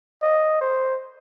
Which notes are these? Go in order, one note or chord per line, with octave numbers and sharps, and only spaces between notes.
D#5
C5